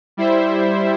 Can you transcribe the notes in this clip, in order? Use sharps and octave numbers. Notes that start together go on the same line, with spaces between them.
G3 E4 C5 E5